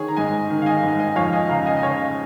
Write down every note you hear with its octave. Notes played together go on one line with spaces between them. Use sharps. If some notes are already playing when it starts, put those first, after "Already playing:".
Already playing: D#3 G#4 C#5
A#5
G#2 D#5 G#5
D#3
F5
D#5 G#5
G#2
D#5 G#5
F2 C#5 F5
D#5 G#5
C#3 F5 A#5
D#5 G#5
D#5
C#3 C#5 F5